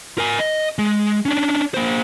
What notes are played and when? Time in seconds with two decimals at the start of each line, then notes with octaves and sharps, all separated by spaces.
0.18 A#4 G#5
0.39 D#5
0.78 G#3
1.25 C#4 D4
1.74 A#3 C5